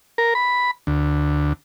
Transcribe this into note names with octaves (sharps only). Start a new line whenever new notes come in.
A#4
B5
D2